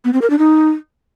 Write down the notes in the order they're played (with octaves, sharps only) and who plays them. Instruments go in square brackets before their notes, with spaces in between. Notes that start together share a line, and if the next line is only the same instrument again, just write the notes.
[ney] B3
C4
A#4
D4
D#4